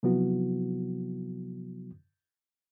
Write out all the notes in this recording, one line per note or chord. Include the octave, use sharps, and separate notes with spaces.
C3 F3 F#3 B3 E4 F#4